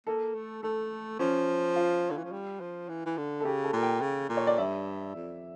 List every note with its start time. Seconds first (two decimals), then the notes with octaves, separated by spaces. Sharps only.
0.07 A#3 A4
0.34 A3
0.63 A3 A4
1.19 F3 C#4
1.76 F4
2.10 D3
2.17 E3
2.24 F3
2.32 G3
2.60 F3
2.89 E3
3.06 E3
3.17 D3
3.40 A4
3.45 C#3 G4
3.64 A4
3.73 A#2
3.83 G5
4.01 C#3
4.29 A#2
4.37 C#5
4.47 D5
4.58 G2 E5
5.15 F2